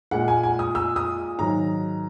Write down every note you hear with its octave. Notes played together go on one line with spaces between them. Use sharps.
A#2 G#3 F#5
G#5
G#5
D#6
E6
D#6
G#2 D#3 F#3 A#5